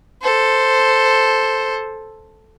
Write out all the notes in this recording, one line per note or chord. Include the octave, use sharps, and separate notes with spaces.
A4 C5